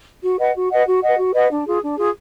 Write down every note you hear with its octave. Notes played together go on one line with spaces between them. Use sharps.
F#4
B4 D#5 F#5
F#4
B4 D#5 F#5
F#4
B4 D#5 F#5
F#4
B4 D#5 F#5
D4
F4 G#4
D4
F4 G#4